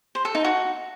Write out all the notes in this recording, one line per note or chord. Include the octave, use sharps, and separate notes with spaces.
C5
A4
D#4
F#4